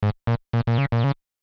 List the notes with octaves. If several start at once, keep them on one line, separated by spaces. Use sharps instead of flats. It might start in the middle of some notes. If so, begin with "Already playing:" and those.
G#2
A#2
A#2
A#2
C#3
A#2
C#3